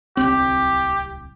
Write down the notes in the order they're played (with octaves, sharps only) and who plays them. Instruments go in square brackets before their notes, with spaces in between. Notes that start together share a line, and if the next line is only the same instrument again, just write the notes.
[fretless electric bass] D1 C2 C4 [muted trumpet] G4